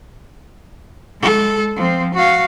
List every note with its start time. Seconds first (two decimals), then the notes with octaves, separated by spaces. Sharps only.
1.21 G#3 A4
1.76 F3 C4
2.14 F#4 F5